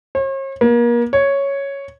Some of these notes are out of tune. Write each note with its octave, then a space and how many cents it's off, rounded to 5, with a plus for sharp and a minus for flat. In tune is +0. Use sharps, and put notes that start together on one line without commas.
C#5 -45
A#3 +35
C#5 +0